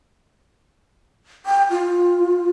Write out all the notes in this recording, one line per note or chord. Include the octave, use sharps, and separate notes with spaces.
G5
F4